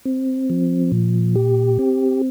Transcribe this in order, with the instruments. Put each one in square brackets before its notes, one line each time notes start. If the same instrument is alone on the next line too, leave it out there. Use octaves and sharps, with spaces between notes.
[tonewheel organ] C4
F3
A#2
G4
C4